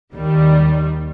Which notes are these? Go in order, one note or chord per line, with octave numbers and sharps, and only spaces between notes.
D#2 D#3 G3